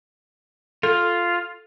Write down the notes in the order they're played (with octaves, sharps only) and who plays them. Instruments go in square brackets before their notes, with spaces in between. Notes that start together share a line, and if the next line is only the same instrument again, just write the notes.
[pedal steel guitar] F4 [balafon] A4